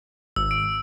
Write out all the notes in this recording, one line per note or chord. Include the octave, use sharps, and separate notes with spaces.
G#1 E6
D7